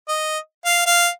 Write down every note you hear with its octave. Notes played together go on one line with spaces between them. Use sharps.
D#5
F5
F5